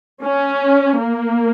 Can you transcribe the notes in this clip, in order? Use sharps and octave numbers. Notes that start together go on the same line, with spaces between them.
C#4
A#3